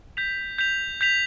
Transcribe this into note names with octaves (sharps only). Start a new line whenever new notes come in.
G6 B6 F7
G6 B6 F7
G6 B6 F7